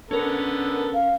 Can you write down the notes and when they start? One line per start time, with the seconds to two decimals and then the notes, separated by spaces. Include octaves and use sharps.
0.11 D3 B3 C#4 A4 A#4
0.94 F5